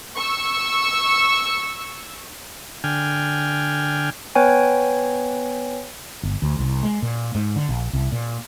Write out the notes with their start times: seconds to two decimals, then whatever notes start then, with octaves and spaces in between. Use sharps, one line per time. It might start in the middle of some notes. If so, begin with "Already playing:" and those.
0.16 C#6 E6
2.84 D3 G5 G#5 F6
4.35 B3 B4 C#5 G5 G#5
6.23 G1
6.42 D2
6.59 C2
6.83 G#3
7.02 A#2
7.35 G#2
7.56 D3
7.69 A#1
7.93 C2
8.12 A#2